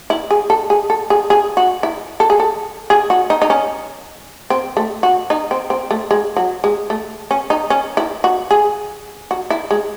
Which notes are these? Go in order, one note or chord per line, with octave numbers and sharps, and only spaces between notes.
E4
G#4
A4
G#4
A4
G#4
G#4
F#4
E4
A4
G#4
A4
G#4
F#4
D#4
D#4
C#4
C4
A3
F#4
D#4
C4
C4
A3
G#3
F#3
G#3
A3
C#4
D#4
C#4
E4
F#4
G#4
F#4
E4
G#3